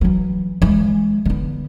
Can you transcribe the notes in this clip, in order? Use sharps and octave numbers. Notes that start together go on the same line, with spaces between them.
E3 F#3
E3 G#3
D3 B3